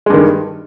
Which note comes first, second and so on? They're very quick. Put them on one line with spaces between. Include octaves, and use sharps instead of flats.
G#3 G2 D#3